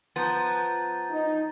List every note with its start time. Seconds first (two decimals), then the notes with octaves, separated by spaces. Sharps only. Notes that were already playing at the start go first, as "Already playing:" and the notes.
0.16 F3 B3 A#5 G6 A6
1.11 D#4